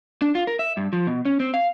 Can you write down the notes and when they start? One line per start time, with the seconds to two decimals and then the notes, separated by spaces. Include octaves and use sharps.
0.22 D4
0.35 F4
0.47 A#4
0.59 E5
0.77 G2
0.93 F3
1.07 B2
1.25 C#4
1.40 C4
1.54 F5